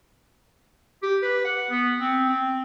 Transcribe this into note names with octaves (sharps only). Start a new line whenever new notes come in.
G4
B4
F#5
B3
C4
C4